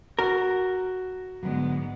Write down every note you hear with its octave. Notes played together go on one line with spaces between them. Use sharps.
F#4 A#4
G#2 D3 F#3 G#3 B3